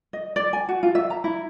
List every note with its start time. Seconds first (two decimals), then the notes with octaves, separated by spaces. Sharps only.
0.13 D#5
0.36 D5
0.53 G#5
0.69 F#4
0.83 F4
0.95 E5
1.10 A#5
1.24 E4